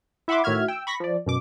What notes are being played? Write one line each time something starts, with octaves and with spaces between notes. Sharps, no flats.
E4 E5 F#5 B5 C6 D6
A2 D#3 F#4 E5 F6 G#6
G5 E6
B5 C#6 A#6 B6
F3 D5
F#2 B2 D6